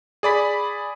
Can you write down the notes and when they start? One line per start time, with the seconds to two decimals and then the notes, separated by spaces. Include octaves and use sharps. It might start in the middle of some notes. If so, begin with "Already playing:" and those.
0.23 G#4 D5 B5 B6